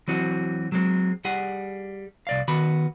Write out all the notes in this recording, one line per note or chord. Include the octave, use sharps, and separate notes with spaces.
E3 F#3 C4 F#4
F#3 G#3 C4
G3 G#4 F#5
C2 D5 F5
D#3 B3 F#4 B5